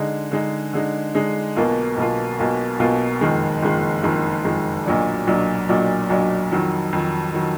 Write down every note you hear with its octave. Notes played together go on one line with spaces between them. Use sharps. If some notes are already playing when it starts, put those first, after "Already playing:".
Already playing: D3 G#3 D#4
D3 G#3 D#4
D3 G#3 D#4
D3 G#3 D#4
B1 B2 A#3 F4
B1 B2 A#3 F4
B1 B2 A#3 F4
B1 B2 A#3 F4
F#1 F2 D#3 G#3
F#1 F2 D#3 G#3
F#1 F2 D#3 G#3
F#1 F2 D#3 G#3
B1 A#2 F#3 D4
B1 A#2 F#3 D4
B1 A#2 F#3 D4
B1 A#2 F#3 D4
F2 D#3 F#3
F2 D#3 F#3
D#3 F#3